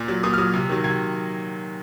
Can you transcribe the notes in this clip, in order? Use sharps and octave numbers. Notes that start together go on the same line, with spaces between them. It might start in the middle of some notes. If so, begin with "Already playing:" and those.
Already playing: A#2
F#3
A#2 D#6
F6
F#3 D#6
C3
D#3 F#3
C3 G#6